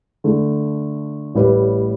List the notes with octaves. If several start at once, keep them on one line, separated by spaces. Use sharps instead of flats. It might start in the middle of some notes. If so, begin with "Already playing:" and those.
D3 A3 E4
A1 A2 G3 E4 B4